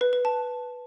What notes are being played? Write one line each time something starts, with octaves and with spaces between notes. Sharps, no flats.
B4
B4
A5